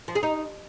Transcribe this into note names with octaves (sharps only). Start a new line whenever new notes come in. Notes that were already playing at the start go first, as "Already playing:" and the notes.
F3
G#4
D#4